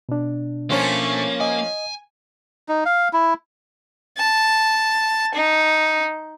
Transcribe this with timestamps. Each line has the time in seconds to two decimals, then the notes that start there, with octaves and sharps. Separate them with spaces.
0.09 B2 D4
0.70 F3 A3 A#3 C#4
1.41 D#5 G#5
2.69 D#4
2.86 F5
3.13 E4
4.18 A5
5.35 D#4